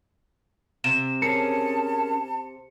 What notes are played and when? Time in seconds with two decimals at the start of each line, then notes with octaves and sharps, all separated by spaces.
0.84 C3 E7
1.22 C#4 G#4 A#4 A5 C#7